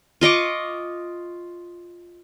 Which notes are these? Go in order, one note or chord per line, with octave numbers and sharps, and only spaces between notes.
F4 D#5 C#6 D6